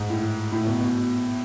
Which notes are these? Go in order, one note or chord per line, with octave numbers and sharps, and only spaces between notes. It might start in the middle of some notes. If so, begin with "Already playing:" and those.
Already playing: G#2
A2
A2
B2
B2